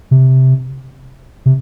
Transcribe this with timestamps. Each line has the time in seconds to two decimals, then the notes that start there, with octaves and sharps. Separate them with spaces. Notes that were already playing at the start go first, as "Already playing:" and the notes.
0.11 C3
1.46 C3